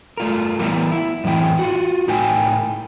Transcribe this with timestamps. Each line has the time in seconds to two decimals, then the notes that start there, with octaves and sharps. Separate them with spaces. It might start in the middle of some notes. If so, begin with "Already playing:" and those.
0.17 A3 F4 A#4
0.59 E3 G3 B3 E4 A#4
0.91 E4
1.24 F#2 A2 E3 C4 E4 G5
1.59 F4 F#4
2.08 A2 D#4 A#4 G5 G#5